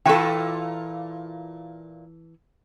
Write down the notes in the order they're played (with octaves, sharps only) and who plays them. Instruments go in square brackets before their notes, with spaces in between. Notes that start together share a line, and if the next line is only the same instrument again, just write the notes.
[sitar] A#2 F4 E5 [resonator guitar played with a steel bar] E3 A4 [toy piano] G5